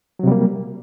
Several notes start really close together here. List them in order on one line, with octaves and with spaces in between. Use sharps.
F#3 C3 G3 A#3